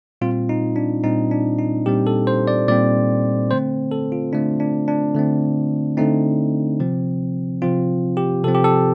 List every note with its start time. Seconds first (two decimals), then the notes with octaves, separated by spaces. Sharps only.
0.21 A#2 G3 C4 F4
0.49 D#4
0.76 D4
1.04 A#2 G3 C4 D#4
1.31 D4
1.59 D#4
1.86 A#2 G3 C4 G4
2.07 A4
2.27 C5
2.47 D5
2.68 A#2 G3 C4 D5
3.51 D3 A3 C4 C5
3.91 A4
4.12 F4
4.33 D3 A3 C4 D4
4.60 D4
4.88 D4
5.15 D3 A3 C4
5.97 D3 A3 C4 D#4
6.80 C3 F3 C4
7.62 C3 F3 C4 F4
8.17 G4
8.44 C3 F3 C4 A4
8.55 G4
8.64 A4